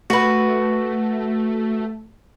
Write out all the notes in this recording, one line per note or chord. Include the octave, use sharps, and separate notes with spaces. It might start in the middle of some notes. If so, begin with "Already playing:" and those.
A3 F#4 B4